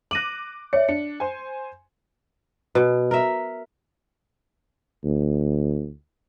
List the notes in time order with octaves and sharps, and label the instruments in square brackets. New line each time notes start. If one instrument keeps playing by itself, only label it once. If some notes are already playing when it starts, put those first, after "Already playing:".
[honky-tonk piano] D6 F#6 [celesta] A#6 D#7 F#7
[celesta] C#5 E5 [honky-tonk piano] D5 C#7
[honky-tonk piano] D4 [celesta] C#7
[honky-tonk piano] C5 G#5
[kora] B2
A#4 E5
[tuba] D2